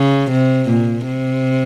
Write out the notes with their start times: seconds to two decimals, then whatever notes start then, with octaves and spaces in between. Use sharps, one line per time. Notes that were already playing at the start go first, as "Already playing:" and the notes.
Already playing: C#3
0.31 C3
0.69 A#2
1.06 C3